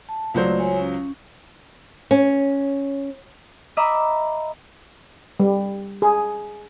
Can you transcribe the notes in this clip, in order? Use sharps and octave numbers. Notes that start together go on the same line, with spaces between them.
A5
C#2 F#3 A3 C5 D5
C#5 G#5
C#4
C#4
D#5 E5 A#5 B5 D6
G3
G#4